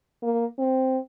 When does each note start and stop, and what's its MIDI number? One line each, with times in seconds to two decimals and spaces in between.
0.22 0.45 58
0.58 0.98 60